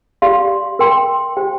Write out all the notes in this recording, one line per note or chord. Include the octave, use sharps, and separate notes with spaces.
G4 D5 F5 C6
A#4 G5 C6
G4 C5 G5